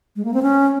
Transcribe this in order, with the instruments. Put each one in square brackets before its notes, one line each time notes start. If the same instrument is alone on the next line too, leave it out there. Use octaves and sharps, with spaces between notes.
[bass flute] G#3
A#3
C4
C#4